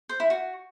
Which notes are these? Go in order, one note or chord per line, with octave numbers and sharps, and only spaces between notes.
C5
E4
F#4